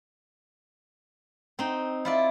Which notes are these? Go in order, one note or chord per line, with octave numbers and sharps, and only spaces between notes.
C4 D#4
E4 F4 D5